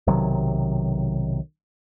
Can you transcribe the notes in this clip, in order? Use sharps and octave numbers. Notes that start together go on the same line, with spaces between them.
B1 C3 D#3 F#3